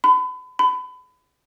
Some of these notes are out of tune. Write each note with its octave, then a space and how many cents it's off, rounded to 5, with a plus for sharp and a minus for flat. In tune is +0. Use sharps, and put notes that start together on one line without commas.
B5 +35
B5 +30